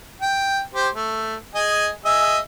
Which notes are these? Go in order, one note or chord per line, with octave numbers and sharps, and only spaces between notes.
G5
G4 C5
A3
G#4 D#5 G#5
G#4 D#5 E5